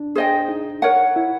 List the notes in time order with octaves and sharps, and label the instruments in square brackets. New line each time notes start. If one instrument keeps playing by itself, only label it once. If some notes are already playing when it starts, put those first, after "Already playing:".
Already playing: [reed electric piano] D4
[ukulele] G#4 C5 D#5 G5
[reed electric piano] D#4
[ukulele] A#4 C#5 F#5
[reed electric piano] E4